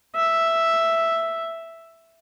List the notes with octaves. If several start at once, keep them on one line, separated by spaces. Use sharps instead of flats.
E5